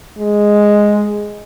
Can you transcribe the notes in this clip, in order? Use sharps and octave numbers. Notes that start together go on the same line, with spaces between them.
G#3